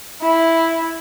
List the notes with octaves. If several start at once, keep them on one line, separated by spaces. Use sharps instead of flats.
E4